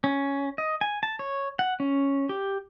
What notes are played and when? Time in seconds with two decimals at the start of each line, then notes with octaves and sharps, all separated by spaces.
0.04 C#4
0.58 D#5
0.81 G#5
1.03 A5
1.19 C#5
1.59 F#5
1.80 C#4
2.29 G4